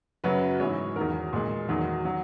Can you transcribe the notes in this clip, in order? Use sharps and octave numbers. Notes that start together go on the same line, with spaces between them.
F#2 C#3 F#3 B4
G#2 E3 G#3 C#5
E2 D#3 F#3 A#4
A#2 G#3
E2 D#3 F#3
F#3